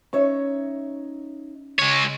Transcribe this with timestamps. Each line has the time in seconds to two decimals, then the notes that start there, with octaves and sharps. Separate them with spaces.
0.13 C#4 D#4 C#5 E5
1.79 C#3 G#3 C#5